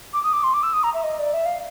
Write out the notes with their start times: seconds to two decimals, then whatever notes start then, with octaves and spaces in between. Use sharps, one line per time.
0.13 D6
0.24 D#6
0.33 D6
0.44 C6
0.54 D6
0.63 E6
0.73 D#6
0.84 A#5
0.94 E5
1.04 D#5
1.19 D5
1.33 E5
1.46 F5